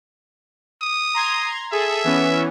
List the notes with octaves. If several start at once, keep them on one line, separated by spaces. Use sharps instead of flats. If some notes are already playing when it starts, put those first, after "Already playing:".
D#6
A#5 C6 G#6
G#4 A4 E5
E3 B3 C#4